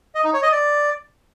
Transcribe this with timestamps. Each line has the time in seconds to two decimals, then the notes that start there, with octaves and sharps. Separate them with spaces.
0.15 D#5
0.24 D#4
0.33 C#5
0.43 D#5
0.52 D5